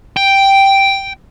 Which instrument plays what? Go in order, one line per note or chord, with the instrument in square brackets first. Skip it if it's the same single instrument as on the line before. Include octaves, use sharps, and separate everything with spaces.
[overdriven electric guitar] G5